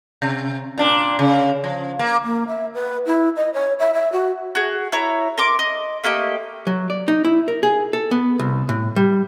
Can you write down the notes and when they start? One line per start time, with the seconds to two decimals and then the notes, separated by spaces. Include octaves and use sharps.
0.22 C3
0.78 A#2 D4
1.19 C#3
1.64 F3
1.99 A#3
2.23 A#3
2.48 E5
2.74 B4
3.06 E4
3.36 D#5
3.54 C#5
3.79 E5
3.94 E5
4.12 F#4
4.55 F#4 G#4
4.92 E4 C#5 A#5
5.38 A#4 C6 D6
5.59 D#5
6.04 A3 A#3 G4 D#5
6.67 F#3
6.90 D5
7.08 D#4
7.25 E4
7.48 A#4
7.63 G#4
7.93 A4
8.11 B3
8.39 C2
8.69 A2
8.96 G3